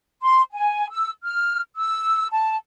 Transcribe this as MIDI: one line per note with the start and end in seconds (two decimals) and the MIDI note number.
0.22 0.41 84
0.52 0.90 80
0.90 1.11 88
1.23 1.60 89
1.76 2.27 88
2.31 2.56 81